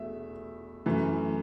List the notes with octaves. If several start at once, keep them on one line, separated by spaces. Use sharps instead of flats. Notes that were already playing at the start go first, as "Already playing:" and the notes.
Already playing: E2 B2 A3 E5
F#2 E3 A3